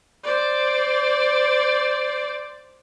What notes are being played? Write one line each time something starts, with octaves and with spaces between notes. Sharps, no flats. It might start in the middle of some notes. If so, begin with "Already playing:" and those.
C5 D5